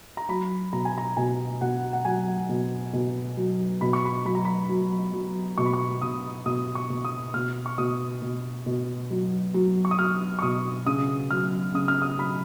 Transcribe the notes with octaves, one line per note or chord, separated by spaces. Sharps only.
A#5
F#3 B5
B2 A#5
G#5
A#5
B2 G#5
B2 F#5
F#5
F#3 G#5
B2
B2
F#3
B2 B5
C#6
B5
F#3 B5
A#5
B5
F#3
F#3
B2 C#6
B5
C#6
B2 D#6
B2 D#6
C#6
B2
D#6
B2 F6
C#6
B2 D#6
B2
B2
F#3
F#3
C#6
D#6
F#3 F6
C#6
B2 D#6
C#3 D#6
F#3 F6
C#3 D#6
F6
D#6
F#3 B5